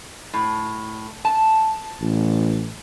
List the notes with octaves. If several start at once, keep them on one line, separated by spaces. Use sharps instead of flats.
A2
A5
A1